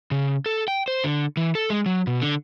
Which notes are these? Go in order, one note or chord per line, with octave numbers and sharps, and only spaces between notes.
C#3
A4
G5
C5
D3
E3
A4
G#3
F#3
B2
D3